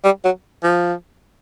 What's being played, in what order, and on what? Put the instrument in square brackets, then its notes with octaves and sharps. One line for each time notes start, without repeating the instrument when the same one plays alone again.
[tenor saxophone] G3
F#3
F3